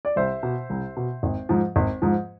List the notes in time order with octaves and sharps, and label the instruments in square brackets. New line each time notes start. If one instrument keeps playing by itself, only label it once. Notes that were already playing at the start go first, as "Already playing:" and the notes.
[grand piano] D5
C2 C5 E5
B2
C2
B2
G#1
G#2 F3
G#1
G#2 F3